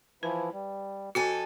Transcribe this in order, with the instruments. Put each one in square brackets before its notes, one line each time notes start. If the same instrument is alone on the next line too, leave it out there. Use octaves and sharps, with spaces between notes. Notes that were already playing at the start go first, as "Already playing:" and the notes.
[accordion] E3 F3 E4 [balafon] B4
[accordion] G3
[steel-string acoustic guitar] F2 A4 G#5 [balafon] F#4